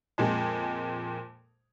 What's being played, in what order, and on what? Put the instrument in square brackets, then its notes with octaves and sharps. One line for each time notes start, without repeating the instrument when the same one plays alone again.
[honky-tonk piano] F2 A#2 G#3